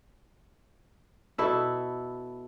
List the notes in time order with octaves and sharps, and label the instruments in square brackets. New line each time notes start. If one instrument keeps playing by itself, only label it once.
[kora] B2 E4 A4